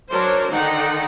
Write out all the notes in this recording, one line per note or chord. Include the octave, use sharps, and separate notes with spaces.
F#3 D4 A#4 C5 C#5 C6
D3 D#3 D#4 F#5 G5